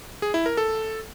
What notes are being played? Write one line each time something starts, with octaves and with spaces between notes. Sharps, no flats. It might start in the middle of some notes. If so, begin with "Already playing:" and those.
G#4
E4
A#4
A4